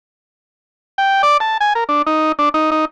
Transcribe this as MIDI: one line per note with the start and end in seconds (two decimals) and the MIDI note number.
0.98 1.22 79
1.23 1.37 74
1.40 1.58 81
1.61 1.73 80
1.75 1.84 70
1.89 2.02 62
2.06 2.32 63
2.39 2.49 62
2.54 2.70 63
2.71 2.85 63